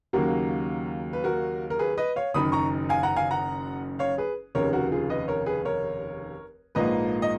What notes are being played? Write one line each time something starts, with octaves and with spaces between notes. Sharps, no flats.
D#2 C#3 F#3 A#3 F#4 A#4
B4
F#4 A#4
A#4
G#4 B4
B4 D#5
C#5 F5
F#1 F#2 D#3 B5 D#6
A#5 C#6
F5 G#5
F#5 A#5
F5 G#5
F#5 A#5
C#5 F5
G#4 B4
F1 D#2 C#3 A#4 C#5
F#4 A#4
F4 G#4
B4 D#5
A#4 C#5
G#4 B4
A#4 C#5
A#1 G#2 F3 A#3 B4 D#5
D#5